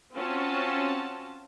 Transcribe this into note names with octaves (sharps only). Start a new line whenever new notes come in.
C4 C#4 F4 F#4 A5